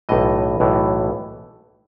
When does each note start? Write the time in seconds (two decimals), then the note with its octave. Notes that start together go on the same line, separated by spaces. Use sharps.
0.09 B1 A2 E3 D#5
0.60 B1 A2 E3